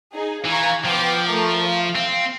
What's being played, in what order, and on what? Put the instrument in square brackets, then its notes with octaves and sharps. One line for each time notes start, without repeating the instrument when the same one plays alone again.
[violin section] D#4 G#4
[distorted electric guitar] E3 [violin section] F5 A#5 C#6
[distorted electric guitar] F3 [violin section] B3 G5 D6
[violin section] A3 A#4
F5
[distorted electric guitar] C4